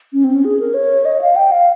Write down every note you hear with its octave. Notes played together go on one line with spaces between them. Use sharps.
C#4
C4
C#4
G#4
A#4
C#5
D#5
F5
G5
F5